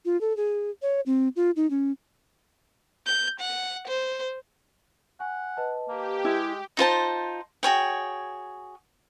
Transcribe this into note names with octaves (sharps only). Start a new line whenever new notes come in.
F4
A4
G#4
C#5
C4
F4
D#4
C#4
G6
F#5
C5
F#5 G#5
B4 D#5 A5
A#3 G4
G#3 E4
D#4 F4 C5 A5
F#4 G#4 C#5 G5